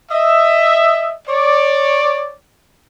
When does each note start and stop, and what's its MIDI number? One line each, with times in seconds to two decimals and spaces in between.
0.11 1.12 75
0.11 1.12 76
1.28 2.33 73
1.28 2.33 74